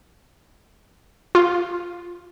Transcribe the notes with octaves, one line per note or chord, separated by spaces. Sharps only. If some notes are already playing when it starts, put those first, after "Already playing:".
F4